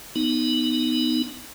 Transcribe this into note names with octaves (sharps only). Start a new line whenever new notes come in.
B3 D#4